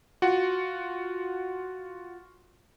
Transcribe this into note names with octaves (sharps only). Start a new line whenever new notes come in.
F4 F#4 F#5